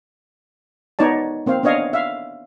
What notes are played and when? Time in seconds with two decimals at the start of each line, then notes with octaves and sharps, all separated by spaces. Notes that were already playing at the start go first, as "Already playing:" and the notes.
0.99 B3 D#4 C#5 D5 A5
1.46 A#3 C4 C5 F5
1.63 B3 D4 C#5 D#5 F5
1.93 E5 F5